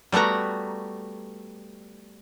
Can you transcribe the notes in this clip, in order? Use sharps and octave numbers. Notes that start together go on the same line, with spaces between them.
G3 A3 B3 F#4 A#5